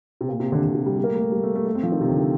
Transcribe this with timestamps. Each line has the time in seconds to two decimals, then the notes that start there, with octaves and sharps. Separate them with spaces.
0.21 C3
0.29 A#2
0.40 C3
0.52 D3
0.63 D3
0.75 C3
0.86 G3
0.98 G3
1.04 A#3
1.09 A3
1.15 G3
1.21 A3
1.32 G3
1.43 A3
1.55 A3
1.66 A3
1.75 C4
1.83 F3
1.92 D#3
2.01 C3
2.09 D3
2.18 D#3